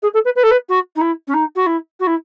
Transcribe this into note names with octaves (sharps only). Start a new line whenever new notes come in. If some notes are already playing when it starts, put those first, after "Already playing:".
G#4
A4
B4
B4
A4
B4
F#4
D#4
E4
C#4
D#4
F#4
E4
F#4
E4